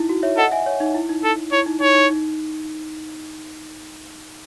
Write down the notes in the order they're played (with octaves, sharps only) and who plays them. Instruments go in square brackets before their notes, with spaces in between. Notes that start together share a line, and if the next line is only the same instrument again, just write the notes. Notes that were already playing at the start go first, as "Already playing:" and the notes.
Already playing: [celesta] D#4 E4
F#4
C#5 E5
[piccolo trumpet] A4 [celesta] D#5 F#5
[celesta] E5 G#5
C#5
D#4
E4
D#4
[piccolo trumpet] A4
[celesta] E4 [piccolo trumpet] C#5
[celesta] D#4
[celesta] D#4 [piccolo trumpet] C#5
[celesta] D#4
D#4